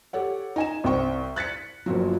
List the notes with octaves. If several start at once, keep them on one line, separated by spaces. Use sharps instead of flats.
G4 A4 C#5 F#5
D#4 G#5 E7
C2 C4 G5 C#6
F#6 A6 B6 C#7
G1 A#2 F3 F#3